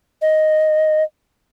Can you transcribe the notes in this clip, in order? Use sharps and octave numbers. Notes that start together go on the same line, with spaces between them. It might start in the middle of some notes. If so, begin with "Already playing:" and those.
D#5